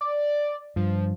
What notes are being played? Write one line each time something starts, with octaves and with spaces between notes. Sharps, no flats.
D5
G2 F3